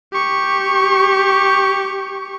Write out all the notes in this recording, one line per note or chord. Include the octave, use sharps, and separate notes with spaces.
G4 C#6